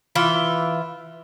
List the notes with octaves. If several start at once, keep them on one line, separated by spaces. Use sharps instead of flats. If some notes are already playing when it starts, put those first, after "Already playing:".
E3 F4 E5